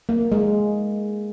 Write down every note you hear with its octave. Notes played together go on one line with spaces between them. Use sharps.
A#3
G#3